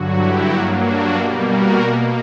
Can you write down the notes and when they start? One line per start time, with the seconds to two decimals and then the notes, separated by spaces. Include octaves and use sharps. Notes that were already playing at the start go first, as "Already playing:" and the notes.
Already playing: G2 D3 F#3 F#4
0.17 E4 G4
0.50 G2 F#3 A#3 D4 F#4
0.83 D4 F#4
1.15 B2 G3 A#3 E4 G4
1.48 F#4 A#4
1.81 B2 A#3